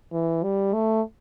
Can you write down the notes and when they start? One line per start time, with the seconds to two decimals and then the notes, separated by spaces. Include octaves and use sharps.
0.12 E3
0.43 G3
0.74 A3